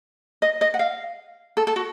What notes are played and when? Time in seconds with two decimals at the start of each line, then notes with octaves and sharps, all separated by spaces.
0.42 D#5
0.61 D#5
0.74 F#5
0.79 F5
1.57 A4
1.67 A4
1.76 F#4